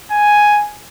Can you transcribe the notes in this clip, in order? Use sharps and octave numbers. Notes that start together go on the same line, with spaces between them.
G#5